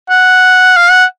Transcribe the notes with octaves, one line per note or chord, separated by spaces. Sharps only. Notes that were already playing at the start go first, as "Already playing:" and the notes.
F#5
F5
F#5